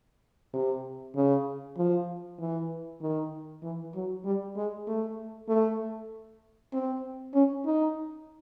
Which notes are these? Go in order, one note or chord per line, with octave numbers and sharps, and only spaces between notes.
C3
C#3
F3
E3
D#3
E3
F#3
G3
G#3
A3
A3
C4
C#4
D#4